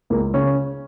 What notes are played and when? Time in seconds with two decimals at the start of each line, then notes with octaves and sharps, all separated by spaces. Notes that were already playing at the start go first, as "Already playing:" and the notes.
0.10 C#2 A#3
0.33 C#3 C#4